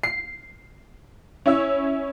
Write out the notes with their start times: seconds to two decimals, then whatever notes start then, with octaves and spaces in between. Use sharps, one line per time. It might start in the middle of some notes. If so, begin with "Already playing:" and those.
0.03 C7
1.46 C#4 E4 C#5 E6